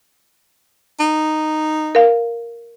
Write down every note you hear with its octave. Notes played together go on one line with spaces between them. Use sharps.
D#4
A#4 F5